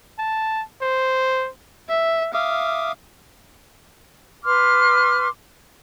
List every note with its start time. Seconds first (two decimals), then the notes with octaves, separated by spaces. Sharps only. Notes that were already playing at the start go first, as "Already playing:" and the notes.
0.18 A5
0.82 C5
1.89 E5
2.34 E5 F5 D6 D#6
4.45 B4 C6 D6 F6